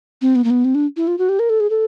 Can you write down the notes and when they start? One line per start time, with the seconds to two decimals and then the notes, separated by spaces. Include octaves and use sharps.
0.22 C4
0.35 B3
0.44 A#3
0.50 B3
0.65 C4
0.75 D4
0.97 E4
1.07 F4
1.18 F#4
1.29 G4
1.39 A#4
1.50 A4
1.60 G#4
1.70 A4